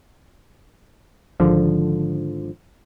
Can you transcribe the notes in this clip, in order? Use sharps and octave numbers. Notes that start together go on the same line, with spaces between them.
G#1 D3 F3